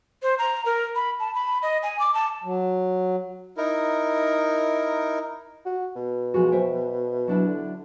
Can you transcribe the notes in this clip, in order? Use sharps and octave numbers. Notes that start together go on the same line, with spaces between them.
C5
A#5
A#4
B5
A5
B5
D#5
G#5
D6
A5
F#3
D#4 E4 A#4
F#4
B2
F3 G#3 F#4
C5 E5 G5
F#3 D4 E4
D3